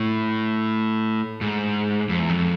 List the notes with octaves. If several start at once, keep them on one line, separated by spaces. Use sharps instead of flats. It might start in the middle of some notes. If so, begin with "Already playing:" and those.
Already playing: A2
G#2
F2
E2
F2